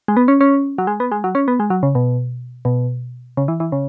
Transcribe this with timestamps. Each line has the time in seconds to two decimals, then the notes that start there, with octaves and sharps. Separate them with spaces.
0.08 G#3
0.17 B3
0.28 C#4
0.41 C#4
0.78 F#3
0.87 G#3
1.00 B3
1.12 G#3
1.24 F#3
1.35 C#4
1.48 B3
1.60 G#3
1.70 F#3
1.83 C#3
1.95 B2
2.65 B2
3.37 C#3
3.48 E3
3.60 E3
3.72 C#3